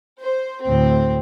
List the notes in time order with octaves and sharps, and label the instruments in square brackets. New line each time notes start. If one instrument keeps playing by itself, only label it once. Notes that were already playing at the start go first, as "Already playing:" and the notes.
[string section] C5
D2 A2 C4